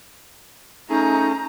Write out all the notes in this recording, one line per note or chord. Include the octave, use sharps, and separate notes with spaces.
A3 C#4 D#4 G#4 A#5